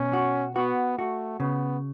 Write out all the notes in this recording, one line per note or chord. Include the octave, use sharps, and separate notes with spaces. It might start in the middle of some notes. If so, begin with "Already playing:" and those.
Already playing: B2 C#4
F#4
B3 F#4
A3 F#4
C#3 B3